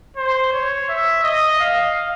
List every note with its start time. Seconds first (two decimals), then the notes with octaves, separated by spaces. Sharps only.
0.17 C5
0.52 C#5
0.89 E5
1.24 D#5
1.60 F5